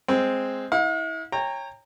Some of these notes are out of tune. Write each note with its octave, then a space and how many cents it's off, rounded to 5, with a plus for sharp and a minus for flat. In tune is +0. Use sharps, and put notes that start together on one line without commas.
G#3 +0 C4 +0 E6 +0
E4 -30 F5 +45
C#5 -10 G5 +25 A#5 -15